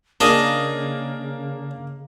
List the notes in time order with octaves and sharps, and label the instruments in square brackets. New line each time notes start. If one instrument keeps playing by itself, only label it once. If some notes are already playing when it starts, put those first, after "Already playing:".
[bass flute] C#3 [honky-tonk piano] A#3 [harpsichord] D4 G#4 G#5 [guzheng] D#5